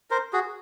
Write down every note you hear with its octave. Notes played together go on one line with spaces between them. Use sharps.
A#4 C5
F#4 G#4